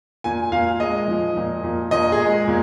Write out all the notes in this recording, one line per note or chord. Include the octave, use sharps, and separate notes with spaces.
A#2 G#5
A#2 F5
G#3 D#5
F3
A#2
A#2
A#2 D#5
G#4
G#3
A#2